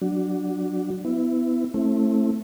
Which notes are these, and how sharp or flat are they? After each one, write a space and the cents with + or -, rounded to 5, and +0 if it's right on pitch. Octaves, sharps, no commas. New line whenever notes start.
F#3 +0 D4 +0 F#4 +5
B3 +25 E4 +0
A3 +0 C4 +35 E4 +0